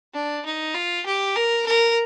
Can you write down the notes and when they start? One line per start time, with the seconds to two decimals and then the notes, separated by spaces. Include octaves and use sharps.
0.14 D4
0.45 D#4
0.75 F4
1.06 G4
1.36 A#4
1.67 A#4